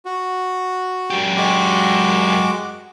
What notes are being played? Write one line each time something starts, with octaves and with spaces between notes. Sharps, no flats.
F#4
F#2 G4
G#3 F#4 D6